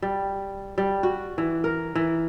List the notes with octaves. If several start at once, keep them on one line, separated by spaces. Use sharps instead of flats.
G3
G3
F#4
E3
A#4
E3